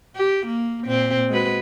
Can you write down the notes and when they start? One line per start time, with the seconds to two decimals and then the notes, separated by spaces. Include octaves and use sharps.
0.16 G4
0.46 A#3
0.85 A#2 C4
1.29 G#3 F#4 B4